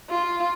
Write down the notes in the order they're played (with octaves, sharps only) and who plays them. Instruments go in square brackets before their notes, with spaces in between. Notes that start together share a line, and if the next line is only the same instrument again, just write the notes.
[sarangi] F4